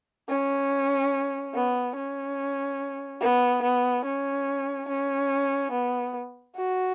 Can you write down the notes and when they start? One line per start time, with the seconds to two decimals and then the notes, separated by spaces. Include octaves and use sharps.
0.29 C#4
1.54 B3
1.96 C#4
3.21 B3
3.62 B3
4.05 C#4
4.88 C#4
5.72 B3
6.56 F#4